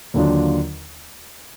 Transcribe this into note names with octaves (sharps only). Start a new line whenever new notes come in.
D#2 D3 F#3 D4 F4